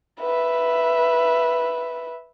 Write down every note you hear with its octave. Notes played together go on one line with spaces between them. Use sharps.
B4 E5